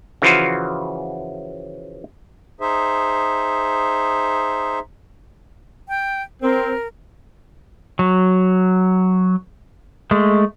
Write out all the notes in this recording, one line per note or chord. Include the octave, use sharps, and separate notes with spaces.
C#3 E3 F3 F4 F#4
D#4 G#4 C5 E5
G5
C4 A#4
F#3
G#3 A3